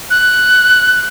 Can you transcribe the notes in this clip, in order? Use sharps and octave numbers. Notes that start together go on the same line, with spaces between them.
F#6